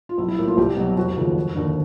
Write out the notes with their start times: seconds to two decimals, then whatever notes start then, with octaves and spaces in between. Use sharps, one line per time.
0.09 F4
0.18 B1 E4
0.28 E4
0.38 A2 F3 A#3
0.48 F4
0.57 C2 G4
0.77 B2 F#3
0.96 F1 F#4
1.17 D#2 C#3 F3
1.36 F1
1.55 D#2 D3